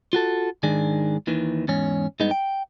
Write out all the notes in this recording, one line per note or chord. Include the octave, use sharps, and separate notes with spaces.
F4 F#4 A4
G#2 D#3 D4 G#4
D#2 D#3 E3
E2 G#2 C#4
G2 G#3 B3 D#4
G5